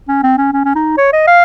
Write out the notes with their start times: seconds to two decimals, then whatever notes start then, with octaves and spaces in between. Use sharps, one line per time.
0.08 C#4
0.23 C4
0.38 C#4
0.53 C#4
0.65 C#4
0.76 D#4
0.97 C#5
1.13 D#5
1.27 F5